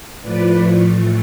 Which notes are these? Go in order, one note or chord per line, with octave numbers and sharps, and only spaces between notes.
A2 F3 A3 B4 D5
A2 E3 A3